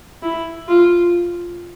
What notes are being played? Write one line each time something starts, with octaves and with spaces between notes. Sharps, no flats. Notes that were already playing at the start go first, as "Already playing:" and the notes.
E4
F4